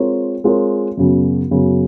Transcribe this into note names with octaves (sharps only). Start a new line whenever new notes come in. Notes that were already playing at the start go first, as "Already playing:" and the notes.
Already playing: G#3 C4 F4 A#4 C#5
G#3 C4 F4 A#4 C#5
F#2 C#3 F#3 B3
F#2 C#3 F#3 B3